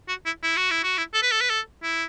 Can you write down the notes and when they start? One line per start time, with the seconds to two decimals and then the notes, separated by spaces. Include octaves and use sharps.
0.08 F#4
0.26 E4
0.43 E4
0.57 F#4
0.71 E4
0.83 F#4
0.98 E4
1.14 A4
1.23 B4
1.32 A4
1.41 B4
1.50 A4
1.83 E4